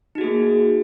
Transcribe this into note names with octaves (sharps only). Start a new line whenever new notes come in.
A#3 D#4 F#4 G#4